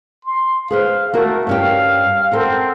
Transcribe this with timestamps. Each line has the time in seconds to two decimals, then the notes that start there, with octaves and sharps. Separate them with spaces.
0.24 C6
0.71 G#4 B4 C5 F5
1.14 A3 A#3 F#4 A#4
1.47 G2 C#4 G4 F5
2.32 C4 A4 A#4 F#5